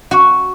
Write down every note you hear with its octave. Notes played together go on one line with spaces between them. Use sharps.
F#4